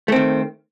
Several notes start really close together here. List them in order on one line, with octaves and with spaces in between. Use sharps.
A3 C4 D#3